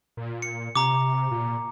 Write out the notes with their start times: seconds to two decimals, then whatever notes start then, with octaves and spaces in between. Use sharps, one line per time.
0.17 A#2
0.42 C#7
0.75 C3 A#5 D6
1.31 A#2